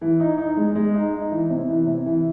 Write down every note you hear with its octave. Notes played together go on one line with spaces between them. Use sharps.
E3
D#4
D#4
G#3
G#3
D#4
D#4
E3
C3
E3
C3
E3